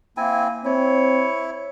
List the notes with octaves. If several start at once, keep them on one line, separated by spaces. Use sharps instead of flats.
A#3 C4 E4 G#5
C4 E4 C#5